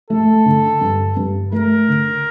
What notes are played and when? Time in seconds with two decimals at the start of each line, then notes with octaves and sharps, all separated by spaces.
0.10 A3 A4
0.46 D3
0.81 G2
1.17 G2
1.52 A3 A#4
1.88 D3